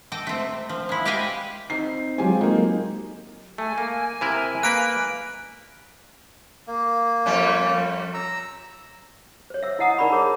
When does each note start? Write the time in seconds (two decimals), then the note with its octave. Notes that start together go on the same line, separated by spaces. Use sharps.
0.12 A4 D#5 G5
0.27 A3 C4
0.39 C3
0.69 F3
0.89 G#3 E4
1.05 G4 B4 D#5 F5 G5 G#5
1.70 C4 D#4 C7
2.18 F#3 G#3 C4 F4 G4 G#5
2.41 A#3 D#4
3.58 A3 G#5
3.78 A#3
4.21 C3 E4 A#4
4.63 A#3 A#4 B4 F#6 D7
6.67 A#3
7.26 F2 G3 C#4
8.14 A#5 E6
9.50 C5 C#5
9.63 E5 E6
9.79 E4 D#5 F#5 A#5 D#6
9.98 D#4 A#4 D5 A#5 B5 C#6
10.12 G#4 A#4 C#5 E5 A#5